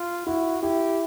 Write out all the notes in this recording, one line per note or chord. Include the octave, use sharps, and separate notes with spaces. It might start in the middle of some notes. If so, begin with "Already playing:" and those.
Already playing: F4
E4 F#4
E4 G4